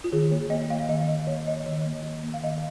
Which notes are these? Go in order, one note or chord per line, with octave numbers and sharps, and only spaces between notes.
F4
D#3 G#4
A#3 C#5
A#3 D#5
A#3 F5
D#3 D#5
D#3 D#5
A#3 C#5
A#3 D#5
D#3
A#3
A#3
A#3
F5
D#3 D#5